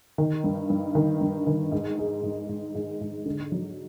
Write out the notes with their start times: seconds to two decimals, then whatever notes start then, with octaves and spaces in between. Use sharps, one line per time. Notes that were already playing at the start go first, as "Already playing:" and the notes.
0.18 D#3
0.44 G2
0.70 G2
0.95 D#3
1.21 G2
1.47 D#3
1.72 G#2
1.99 G#3
2.23 G#2
2.49 G#2
2.75 G#2
3.01 G#2
3.26 D3
3.52 F#3